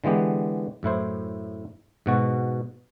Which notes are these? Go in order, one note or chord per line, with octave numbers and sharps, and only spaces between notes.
D3 E3 G#3 B3 G4
F#2 A2 E4 C5
G#2 B2 F#4